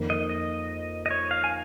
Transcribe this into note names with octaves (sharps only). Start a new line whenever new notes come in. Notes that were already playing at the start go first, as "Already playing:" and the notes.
Already playing: F2 D#3 A#3
D#5
D#5
D#5
C#5
F5
G#5